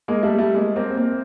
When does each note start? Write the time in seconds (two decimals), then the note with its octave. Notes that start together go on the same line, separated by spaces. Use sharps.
0.08 G#3 A#3
0.23 G3 A3
0.38 G3 A3
0.55 G#3 A#3
0.76 A#3 C4
0.97 A#3 C4